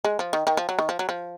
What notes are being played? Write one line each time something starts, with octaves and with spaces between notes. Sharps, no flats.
G#3
F3
D#3
D#3
F3
F#3
D#3
F3
F#3
F3